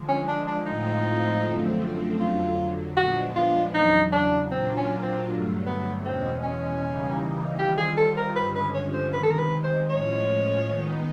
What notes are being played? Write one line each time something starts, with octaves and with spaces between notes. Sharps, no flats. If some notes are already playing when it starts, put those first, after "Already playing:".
Already playing: D3 F3 G#3
C#4
D4
D4
A2 F3 G#3 C4 D#4 F4
F#2 D3 F3 A3 C4
F2 D3 F#3 F4
A#2 F3 G#3 B3 D4 F#4
F4
E2 C#3 F#3 D#4
D4
A#2 F#3 A#3 C4 D4 F4
C#4
C4
G2 D3 F#3 A3
B3
E2 B2 G#3 C4 C#4
C#4
C#3 E3 G3 A#3 D#4
D#3 G3 C4 F4 G4
G#4
A4
A#4
G2 D3 F3 G#3 C#4 B4
B4
C#5
C5
C3 D#3 G#3 B4
A4
A#4
B4
C5
A2 F3 G#3 C#4 F4 C#5
D#3 G#3 B3 D#4